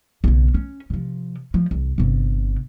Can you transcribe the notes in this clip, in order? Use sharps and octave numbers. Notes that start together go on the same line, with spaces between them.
B1 C#3
C#4
C3 F3
F3
C2
G1 C3